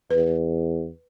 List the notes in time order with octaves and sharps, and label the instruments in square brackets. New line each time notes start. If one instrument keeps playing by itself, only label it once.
[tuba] E2 [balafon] B4